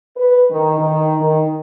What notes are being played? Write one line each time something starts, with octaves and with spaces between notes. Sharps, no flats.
B4
D#3
D#3
D#3